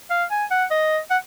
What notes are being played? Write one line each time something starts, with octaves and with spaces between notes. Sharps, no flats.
F5
G#5
F#5
D#5
F#5